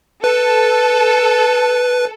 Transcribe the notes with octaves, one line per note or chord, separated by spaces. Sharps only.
A4 B4